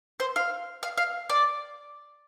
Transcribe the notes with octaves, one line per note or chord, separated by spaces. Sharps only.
C5
F5
F5
F5
D5